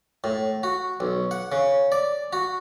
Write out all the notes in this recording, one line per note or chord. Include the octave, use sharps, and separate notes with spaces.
A2
F#4
B1
F#5
C#3
D5
F#4